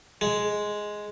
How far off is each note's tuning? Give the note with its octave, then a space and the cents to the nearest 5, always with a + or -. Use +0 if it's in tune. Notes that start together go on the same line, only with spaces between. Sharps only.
G#3 +5